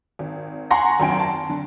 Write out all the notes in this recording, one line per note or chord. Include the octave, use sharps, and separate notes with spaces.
G#1
F#5 G#5 A#5 C6 C#6 A#6
G#1 F#2 G5 D7
A5
D3